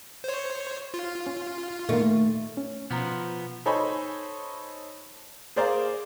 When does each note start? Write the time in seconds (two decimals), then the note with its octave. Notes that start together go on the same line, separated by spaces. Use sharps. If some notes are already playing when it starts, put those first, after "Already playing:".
0.24 C5 C#5
0.94 F4
1.26 C#4
1.89 A#2 D#3 A3 A#3
2.57 C#4
2.91 B2 F3 B3 A#5
3.66 D#4 A4 C5 C#5 G#5 B5
5.56 G#4 A#4 C5 D5 F5 A#5